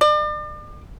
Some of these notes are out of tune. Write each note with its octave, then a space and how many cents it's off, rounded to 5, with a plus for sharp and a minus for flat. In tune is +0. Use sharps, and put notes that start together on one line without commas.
D5 +40